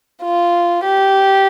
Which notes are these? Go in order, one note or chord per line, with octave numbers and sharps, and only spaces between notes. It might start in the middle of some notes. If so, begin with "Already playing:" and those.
F4
G4